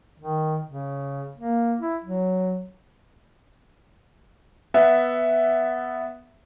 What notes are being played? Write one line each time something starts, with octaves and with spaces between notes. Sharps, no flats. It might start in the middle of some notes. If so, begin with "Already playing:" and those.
D#3
C#3
A#3
E4
F#3
B3 E5 F#5